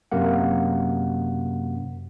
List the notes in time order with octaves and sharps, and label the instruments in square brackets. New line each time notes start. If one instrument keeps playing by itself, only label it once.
[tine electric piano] F#2 C3 A#3 F#5